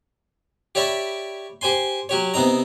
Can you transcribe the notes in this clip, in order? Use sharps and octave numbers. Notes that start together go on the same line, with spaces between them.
G4 C#5 D5 E5 B5
G4 C5 G#5 C6
F#3 G4 C#5
C3 B3 C4 D#4 A#5